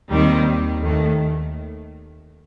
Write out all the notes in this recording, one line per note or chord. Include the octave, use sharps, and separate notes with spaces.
D#2 D#3 G3 C4 D#4
D#2 D#3 A3